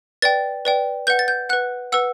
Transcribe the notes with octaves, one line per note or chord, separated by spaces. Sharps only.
B4 D5 G5 A6
B4 D5 G5
B4 F#5 G6
A6
G6
B4 F#5 F#6
B4 F#5 E6